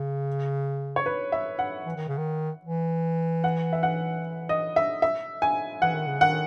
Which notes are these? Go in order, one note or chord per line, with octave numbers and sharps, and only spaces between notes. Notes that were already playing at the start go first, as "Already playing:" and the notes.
Already playing: C#3
C#5
B4
E5
F#5
E3
D#3
C#3
D#3
E3
F#5
E5
F#5
D#5
E5
E5
G#5
E3 F#5
D#3
C#3
D#3 F#5